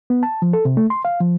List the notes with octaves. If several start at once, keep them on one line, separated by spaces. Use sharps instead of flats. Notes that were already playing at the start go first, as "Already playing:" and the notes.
B3
A5
F3
A4
C3
A3
C6
F5
F3